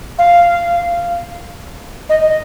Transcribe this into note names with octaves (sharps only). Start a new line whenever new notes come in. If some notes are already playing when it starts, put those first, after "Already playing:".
F5
D#5